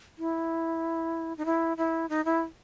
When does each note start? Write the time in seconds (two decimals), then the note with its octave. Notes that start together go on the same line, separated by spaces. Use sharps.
0.18 E4
1.37 D#4
1.45 E4
1.77 E4
2.09 D#4
2.25 E4